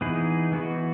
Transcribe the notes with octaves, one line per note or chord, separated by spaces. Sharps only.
E3 B3 D#4 G#4 B4
E3 B3 F#4 B4